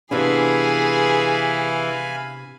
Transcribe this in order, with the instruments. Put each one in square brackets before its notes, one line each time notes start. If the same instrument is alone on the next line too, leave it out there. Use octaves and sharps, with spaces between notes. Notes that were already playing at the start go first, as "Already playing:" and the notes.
[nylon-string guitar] C3 B3 D4 [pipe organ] E3 [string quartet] G#4 [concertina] F5 G#5 B5